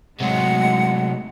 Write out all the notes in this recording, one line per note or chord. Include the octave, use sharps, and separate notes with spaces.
A2 C3 F#3 G#3 F#5